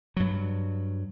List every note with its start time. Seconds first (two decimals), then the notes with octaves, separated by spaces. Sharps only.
0.17 G2 F#3